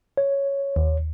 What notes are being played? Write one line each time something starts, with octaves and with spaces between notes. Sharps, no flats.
C#5
D#2